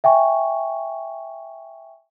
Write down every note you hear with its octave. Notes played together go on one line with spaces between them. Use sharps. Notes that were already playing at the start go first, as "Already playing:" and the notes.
E5 G5 G#5 C#6